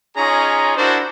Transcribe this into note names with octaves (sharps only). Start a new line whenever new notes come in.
C#4 D#4 F4 G#4 C#5 A#5
D4 E4 F#4 A#4 C5 A5